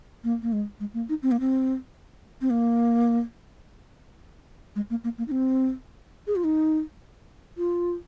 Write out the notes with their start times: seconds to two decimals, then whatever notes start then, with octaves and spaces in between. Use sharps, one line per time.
0.24 A#3
0.42 A#3
0.53 G#3
0.80 G#3
0.94 A#3
1.09 D#4
1.23 C4
1.31 A#3
1.40 C4
2.41 C4
2.50 A#3
4.76 G#3
4.90 A#3
5.04 A#3
5.18 A#3
5.28 D#4
5.32 C4
6.27 G#4
6.36 F4
6.44 D#4
7.58 F4